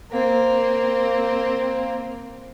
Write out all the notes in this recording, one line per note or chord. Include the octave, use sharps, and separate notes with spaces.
A#3 C4